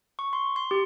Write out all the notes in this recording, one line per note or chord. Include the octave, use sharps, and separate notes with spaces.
C#6
C6
C6
G4